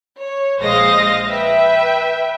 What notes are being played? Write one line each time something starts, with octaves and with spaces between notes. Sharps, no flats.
C#5
A#1 G#3 C5 D#5 F5 A#6
B4 E5 G5